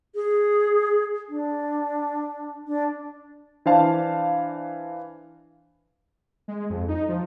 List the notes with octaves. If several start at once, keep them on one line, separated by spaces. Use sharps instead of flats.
G#4
D4
D4
E3 D4 C5 F5 A5
G#3
F2
D#4
F3